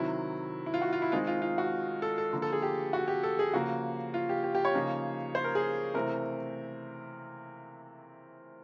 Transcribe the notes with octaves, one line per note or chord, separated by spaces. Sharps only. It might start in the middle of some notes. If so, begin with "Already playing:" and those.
Already playing: C3 D#3 F#3 E4
E4
F4
F#4
F4
E4
D#3 G#3 C4 D#4 F4
F4
F4
F#4
A4
A4
D3 F3 A#3
A4
G#4
G4
F#4
G4
A4
G#4
C#3 F3 A#3 F#4
F4
G4
G4
G4
C#5
C#3 F3 A#3 D#4
C5
A#4
G#4
C3 E3 A3 C4 A#4